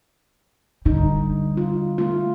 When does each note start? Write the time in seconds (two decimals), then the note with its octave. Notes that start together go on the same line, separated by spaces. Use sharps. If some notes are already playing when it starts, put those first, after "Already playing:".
0.86 D3 G3 D#4
1.57 F4
1.98 A3 F4